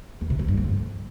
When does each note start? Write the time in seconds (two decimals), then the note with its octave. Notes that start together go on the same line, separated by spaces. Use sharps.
0.21 E2
0.30 C3
0.39 C#3
0.48 G2
0.57 F2